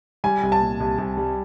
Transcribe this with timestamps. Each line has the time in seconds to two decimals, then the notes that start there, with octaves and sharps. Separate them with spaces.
0.24 G3 G#5
0.43 C2
0.52 A5
0.61 A#2
0.80 C2
0.98 C2
1.17 G3